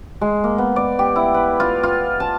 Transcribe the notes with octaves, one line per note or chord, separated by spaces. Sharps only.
G#3
A#3
B3
D5
G4
E4
B4
F4
F4
A5